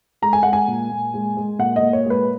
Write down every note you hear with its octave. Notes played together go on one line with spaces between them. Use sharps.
G#3 A#5
G#5
G#3 F#5
G#5
A#2
A#2
G#3
G#3
A#2 F#5
D#5
A#2
C#5
G#3
B4